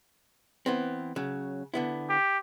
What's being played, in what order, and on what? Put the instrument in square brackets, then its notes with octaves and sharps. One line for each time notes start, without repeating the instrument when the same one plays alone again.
[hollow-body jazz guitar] E3 B3 C4
C#3 F#3
D3 B3 E4
[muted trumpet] G4